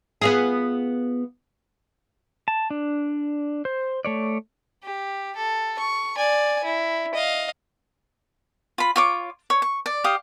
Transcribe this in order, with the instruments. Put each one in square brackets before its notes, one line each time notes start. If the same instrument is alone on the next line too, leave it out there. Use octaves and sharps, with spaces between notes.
[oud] B3 F4 G#4
[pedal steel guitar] A5
D4
C5
A3 C#5 D5
[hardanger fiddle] G4
A4
C#6
D5 G#5
E4
D#5 F5
[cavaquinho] F4 B5
F4 C#5 D6
C#5
C#6
D5
G4 F5 D#6